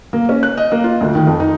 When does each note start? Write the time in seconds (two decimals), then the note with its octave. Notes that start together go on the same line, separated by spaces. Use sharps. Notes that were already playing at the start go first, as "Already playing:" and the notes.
0.13 A#3
0.29 C#4
0.43 F#6
0.57 D#5
0.72 A#3
0.84 F4
1.01 D2
1.15 D#3
1.27 F2
1.40 D#4